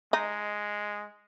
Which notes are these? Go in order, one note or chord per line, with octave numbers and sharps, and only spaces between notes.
G#3 D#4